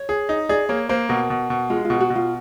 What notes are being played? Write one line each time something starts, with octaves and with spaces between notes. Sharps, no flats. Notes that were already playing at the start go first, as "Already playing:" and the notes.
Already playing: C#5
G#4
D#4
G#4 D5
A#3 C#5
A#3 C5
B2 A#4
B2
B2
G#3 F4
F4
B2
F#4
B2
F4